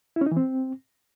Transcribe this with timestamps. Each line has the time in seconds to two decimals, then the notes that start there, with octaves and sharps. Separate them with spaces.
0.16 E4
0.21 C#4
0.26 D#4
0.31 E3
0.37 C4